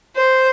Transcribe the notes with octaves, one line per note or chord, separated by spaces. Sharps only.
C5